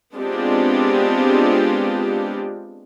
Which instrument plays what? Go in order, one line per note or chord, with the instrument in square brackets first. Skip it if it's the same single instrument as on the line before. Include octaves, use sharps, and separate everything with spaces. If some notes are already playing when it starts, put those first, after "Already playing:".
[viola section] G#3 B3 C4 D4 F4 G4